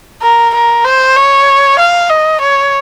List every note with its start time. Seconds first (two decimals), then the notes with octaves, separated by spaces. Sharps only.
0.22 A#4
0.54 A#4
0.85 C5
1.16 C#5
1.79 F5
2.10 D#5
2.41 C#5